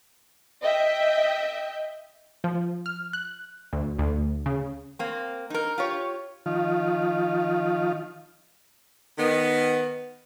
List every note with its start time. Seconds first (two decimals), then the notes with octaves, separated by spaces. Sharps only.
0.62 D#5 E5 G5
2.44 F3
2.86 F6
3.13 F#6
3.73 D2
3.99 D2
4.46 C#3
4.99 A#3 C4
5.50 D#4 A#4
5.78 F4 G4 C#5
6.46 D#3 F3 F4
9.17 D#3 B3